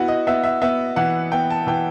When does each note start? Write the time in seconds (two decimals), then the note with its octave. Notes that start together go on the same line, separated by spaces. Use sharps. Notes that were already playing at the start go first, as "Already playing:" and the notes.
Already playing: B3 E4 F#4
0.08 D#5
0.27 B3 E5
0.44 E5
0.62 B3 E5
0.96 E3 F#5
1.32 B3 G5
1.50 A5
1.67 E3 G5